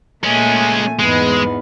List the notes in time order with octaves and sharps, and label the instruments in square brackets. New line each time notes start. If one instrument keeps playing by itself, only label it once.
[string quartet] A#2 A3 G#5 [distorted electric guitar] G#3 C#4
[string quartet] E2 G#2 B3 [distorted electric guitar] G#3